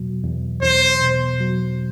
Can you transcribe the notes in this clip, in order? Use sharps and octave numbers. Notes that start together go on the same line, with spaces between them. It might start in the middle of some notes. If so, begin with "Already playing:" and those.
Already playing: E2 B2 F#3
E2
E2 C5
B2
F#3